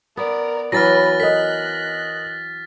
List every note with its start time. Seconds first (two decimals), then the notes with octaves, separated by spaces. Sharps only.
0.17 B3 A#4 D5
0.72 E3 F#3 B4 B5 F6 A6 A#6
1.20 A#4 D#5 F#6 B6